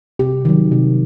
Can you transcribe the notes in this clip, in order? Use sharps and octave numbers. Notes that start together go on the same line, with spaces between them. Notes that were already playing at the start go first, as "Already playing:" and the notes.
C3 G4
D#3 F#3
C3